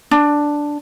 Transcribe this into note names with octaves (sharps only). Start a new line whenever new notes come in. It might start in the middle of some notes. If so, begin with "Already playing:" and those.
D4